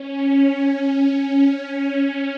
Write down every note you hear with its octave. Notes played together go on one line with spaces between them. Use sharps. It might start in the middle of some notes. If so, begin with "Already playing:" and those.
Already playing: C#4